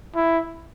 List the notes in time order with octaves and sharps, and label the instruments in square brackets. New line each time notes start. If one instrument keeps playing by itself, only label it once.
[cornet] E4